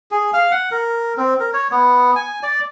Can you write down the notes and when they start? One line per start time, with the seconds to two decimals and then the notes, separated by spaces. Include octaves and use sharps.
0.11 G#4
0.33 F5
0.51 F#5
0.71 A#4
1.17 C4
1.40 A#4
1.53 C#5
1.71 B3
2.16 G#5
2.43 D5